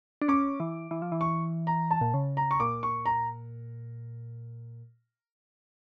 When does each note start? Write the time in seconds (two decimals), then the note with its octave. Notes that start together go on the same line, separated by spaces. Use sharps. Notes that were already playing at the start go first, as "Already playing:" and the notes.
0.22 D4
0.28 C#4 D6
0.60 E3
0.91 E3
1.02 F3
1.12 E3
1.21 C#6
1.67 A#5
1.91 A5
2.01 A#2
2.14 C#3
2.37 A#5
2.51 C#6
2.60 A#2 D6
2.83 C#6
3.06 A#5